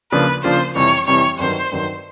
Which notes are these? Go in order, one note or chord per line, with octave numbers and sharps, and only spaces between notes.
C#3 F3 A#3 D4 F4 B4
C#3 F3 A#3 D4 F4 C5
F2 C3 E3 G3 C#5
F2 C3 E3 G3 C#5
G2 D#3 F#3 C5
G2 D#3 F#3